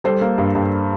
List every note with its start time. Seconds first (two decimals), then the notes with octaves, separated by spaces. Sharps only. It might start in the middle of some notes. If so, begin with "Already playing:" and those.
0.04 G3 A4 C5
0.21 A#3
0.38 G2
0.55 G2